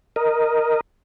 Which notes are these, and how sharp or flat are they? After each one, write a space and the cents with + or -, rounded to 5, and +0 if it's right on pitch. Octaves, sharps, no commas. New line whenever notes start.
A#4 +0 D#5 +0